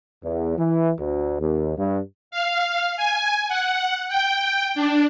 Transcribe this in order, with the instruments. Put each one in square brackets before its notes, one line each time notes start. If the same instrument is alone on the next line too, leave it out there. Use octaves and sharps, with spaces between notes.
[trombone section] E2
E3
D2
D#2
G2
[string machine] F5
G#5
F#5
G5
D4